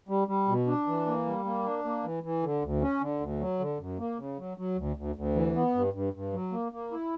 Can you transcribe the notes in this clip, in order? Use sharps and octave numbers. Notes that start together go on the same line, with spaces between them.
G3
G3
B2
D4
E3
A#3
G3
A#3
D4
A#3
E3
E3
D3
D2
C#4
D3
D2
F#3
D3
F#2
A#3
C#3
F#3
F#3
D2
D2
D2
E3
B3
G2
G2
G2
F#3
A#3
A#3
E4